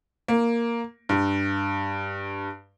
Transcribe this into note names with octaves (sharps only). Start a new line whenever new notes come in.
A#3
G2